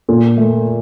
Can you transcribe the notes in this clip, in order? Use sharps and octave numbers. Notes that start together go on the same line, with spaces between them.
A#2
A3